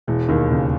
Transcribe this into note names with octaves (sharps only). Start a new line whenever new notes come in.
E1 E3
D#2 D#3
E1 C#3